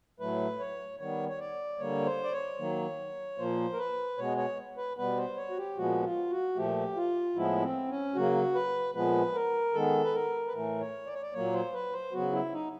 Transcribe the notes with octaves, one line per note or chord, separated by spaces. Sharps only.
A2 F#3 A3 B4
C#5
D#3 G3 B3 C#5
C#5
D5
D3 G3 A#3 C#5
C5
D5
C#5
D#3 F#3 A#3
A#2 F3 A#3 C5
A#4
B4
B2 G#3 B3 C#5
C#5
B4
B2 G3 B3 B4
C5
C#5
F#4
G4
A#2 F3 G#3 B3 F#4
F4
F#4
A#2 F3 A3 G4
F4
A2 F3 G#3 B3 E4
C4
C#4
C#3 F#3 A#3 F#4
B4
A#2 F3 G#3 B3 B4
A#4
D#3 G#3 B3 A4
B4
A#4
B4
A2 E3 A3 A#4
C#5
D5
C#5
D5
A#2 F#3 A#3 C#5
C5
B4
C5
C#3 F#3 B3 F#4
E4
D#4